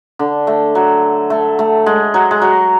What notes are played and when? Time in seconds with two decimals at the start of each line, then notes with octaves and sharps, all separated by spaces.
0.19 D3
0.47 A3
0.75 F#3
1.30 A3
1.59 A3
1.86 G#3
2.14 F#3
2.31 G#3
2.42 F#3